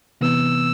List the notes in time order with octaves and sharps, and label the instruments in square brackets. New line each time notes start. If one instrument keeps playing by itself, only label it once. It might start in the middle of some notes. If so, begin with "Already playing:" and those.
[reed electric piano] C3 E3 B3 [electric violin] E6